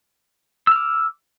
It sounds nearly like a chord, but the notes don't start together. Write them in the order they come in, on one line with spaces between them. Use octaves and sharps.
E6 F6 D6